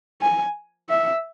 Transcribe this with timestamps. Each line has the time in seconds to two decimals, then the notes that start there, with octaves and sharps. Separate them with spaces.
0.22 G#5
0.90 E5